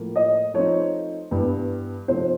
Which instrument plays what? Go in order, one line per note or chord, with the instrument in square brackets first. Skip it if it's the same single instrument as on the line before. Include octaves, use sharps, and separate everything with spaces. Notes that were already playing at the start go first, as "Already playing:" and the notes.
Already playing: [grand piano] A2 F3 A#3
[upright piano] D#5
[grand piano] F3 A3 C4 D#4 [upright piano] C#5
[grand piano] G2 E3 G3 B3
[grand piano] C3 F3 A3 C4 D#4 [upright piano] C5